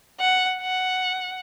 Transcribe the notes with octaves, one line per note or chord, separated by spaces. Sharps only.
F#5
F#5